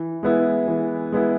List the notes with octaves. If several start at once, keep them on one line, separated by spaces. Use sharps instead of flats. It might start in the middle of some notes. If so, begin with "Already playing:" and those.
Already playing: E3
G#3 B3 E4
E3
G#3 B3 E4